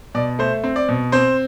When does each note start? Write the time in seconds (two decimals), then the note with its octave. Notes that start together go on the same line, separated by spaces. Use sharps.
0.15 B2 D5
0.39 A3 C5
0.64 C4
0.76 D5
0.89 B2
1.12 C4 C5